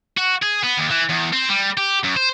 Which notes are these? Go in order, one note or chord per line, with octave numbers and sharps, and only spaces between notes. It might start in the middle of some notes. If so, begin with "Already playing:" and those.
F#4
G#4
B3
D#2
E3
E2
C4
G3
G4
F#2
C5